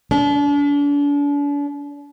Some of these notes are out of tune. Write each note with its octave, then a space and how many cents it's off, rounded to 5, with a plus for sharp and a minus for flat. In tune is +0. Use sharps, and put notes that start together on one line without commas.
D4 -40